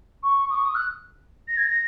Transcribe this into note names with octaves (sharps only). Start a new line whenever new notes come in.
C#6
D#6
C#6
D#6
F#6
A#6
G#6
A#6